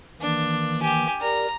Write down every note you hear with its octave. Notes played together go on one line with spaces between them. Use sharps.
D#3 E3 A#3 D4
G4 G#5
G4 A#4 D5 A#5